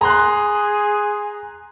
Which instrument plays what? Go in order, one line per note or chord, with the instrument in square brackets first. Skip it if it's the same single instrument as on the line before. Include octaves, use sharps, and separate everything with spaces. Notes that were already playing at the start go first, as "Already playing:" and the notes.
[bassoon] G#4 [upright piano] A#5 C6 F#6